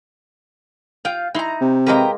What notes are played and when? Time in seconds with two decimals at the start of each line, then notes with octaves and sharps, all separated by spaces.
1.05 F4 F5 G5 G6
1.35 D#4 E4 A#5 C6
1.61 C3
1.87 G#3 A#3 A#4 B4 G5 A#5